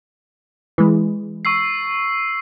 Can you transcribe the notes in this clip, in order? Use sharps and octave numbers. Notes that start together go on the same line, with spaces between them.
E3 G#3
C#6 E6 C7